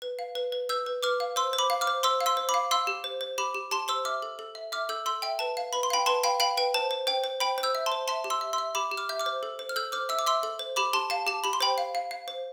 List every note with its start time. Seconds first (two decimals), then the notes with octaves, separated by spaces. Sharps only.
0.02 B4
0.19 F5
0.35 B4
0.52 B4
0.69 B4 E6 G6
0.86 B4
1.03 B4 D6 F6
1.20 F5
1.36 C5 C6 E6
1.53 C5
1.59 B5 D6
1.70 F5
1.81 D6 F6
1.87 C5
2.03 C5 C6 E6
2.21 F5
2.26 C6 E6
2.37 C5
2.49 B5 D6
2.54 F5
2.71 F5 C6 E6
2.87 G4
3.04 C5
3.21 C5
3.38 G4 B5 D6
3.54 G4
3.71 G4 A5 C6
3.88 C5 C6 E6
4.05 E5 D6 F6
4.22 A4
4.39 A4
4.55 E5
4.72 E5 D6 F6
4.89 A4 E6 G6
5.06 A4 C6 E6
5.22 E5 G5
5.39 B4 A5
5.57 F5
5.73 B4 B5
5.83 C6
5.90 F5 G5 B5
6.06 B4 A5 C6
6.24 F5 G5 B5
6.40 F5 G5 B5
6.57 B4 G5
6.74 C5 A5
6.91 C5
7.07 C5 G5
7.24 C5
7.40 C5 G5 B5
7.58 C5
7.63 E6 G6
7.75 E5
7.86 A5 C6
7.92 C5
8.08 E5 A5 C6
8.24 G4
8.30 C6 E6
8.41 E5
8.53 C6 E6
8.58 E5
8.75 G4 B5 D6
8.92 G4
8.97 D6 F6
9.09 E5 G6
9.19 D6 F6
9.26 C5
9.43 A4
9.59 C5
9.69 F6
9.76 A4 E6 G6
9.92 C5 D6 F6
10.09 E5 E6
10.19 D6
10.26 E5 C6 E6
10.43 A4
10.59 C5
10.76 G4 B5 D6
10.93 G4 A5 C6
11.10 F5 A5
11.27 G4 A5
11.44 G4 B5
11.53 C6
11.60 C5 G5 B5
11.78 F5
11.95 F5
12.11 F5
12.28 C5